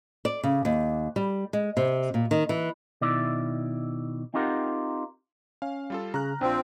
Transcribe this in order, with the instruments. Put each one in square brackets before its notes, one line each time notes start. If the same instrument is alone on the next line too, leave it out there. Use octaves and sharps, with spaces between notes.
[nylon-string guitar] D5
C#3
D#2
G3
G#3
C3
A#2
D#3
E3
[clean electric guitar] B2 D#3 E4 D5 E5
C4 D#4 F4 G4 A#4 F#5
[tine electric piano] C#4 [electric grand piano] F5
[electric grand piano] G3 F4 A4
[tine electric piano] C#3 [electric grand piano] A#5 F6 F#6
[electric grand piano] A#1 [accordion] C4 [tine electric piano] D4 F4